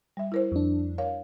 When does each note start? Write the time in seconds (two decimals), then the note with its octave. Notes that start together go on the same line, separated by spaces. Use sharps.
0.17 G3 E5
0.32 E4 A#4 C5
0.52 F2 D4
0.98 A#4 C#5 F5